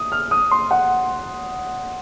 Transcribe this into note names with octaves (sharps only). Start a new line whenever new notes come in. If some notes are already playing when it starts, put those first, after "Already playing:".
Already playing: D#6
F6
D#6
C6
F#5